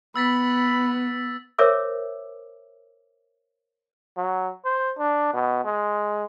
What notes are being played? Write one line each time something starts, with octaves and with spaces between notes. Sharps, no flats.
B3 B5 E6 A6 B6
A#4 C5 C#5 E5 D6 E6
F#3
C5
D4
B2
G#3